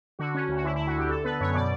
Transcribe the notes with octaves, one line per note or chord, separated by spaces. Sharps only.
D3 F#4
C#4
D2
F#4
D3 E4
E4
D2
F#4
D2 G4
D3 A4
B3 B4
F#2 C#5
B2 D5